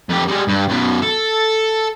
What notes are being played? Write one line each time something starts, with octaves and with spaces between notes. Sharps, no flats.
F2 G4
G3 G#3
G2
F#2 B2
A4